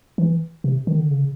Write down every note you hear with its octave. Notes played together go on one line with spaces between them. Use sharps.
E3
C3
D#3
D3
C#3